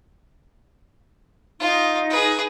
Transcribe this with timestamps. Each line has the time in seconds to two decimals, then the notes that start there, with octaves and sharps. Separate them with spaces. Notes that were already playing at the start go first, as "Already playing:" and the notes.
1.60 D#4 F4
2.09 G#4 B4